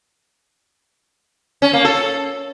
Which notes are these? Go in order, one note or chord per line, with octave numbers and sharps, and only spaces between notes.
C#4
A#3
A4